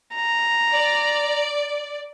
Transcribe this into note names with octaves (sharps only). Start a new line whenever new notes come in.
A#5
D5